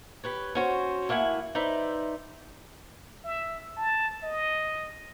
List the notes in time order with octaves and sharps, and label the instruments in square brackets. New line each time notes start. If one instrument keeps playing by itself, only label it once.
[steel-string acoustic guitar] G4 B4 C#5
C#4 F#4 C5
A3 A#3 E4 F#5 G#5
D#4 B4 C5 D5 E5
[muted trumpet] E5
A5
D#5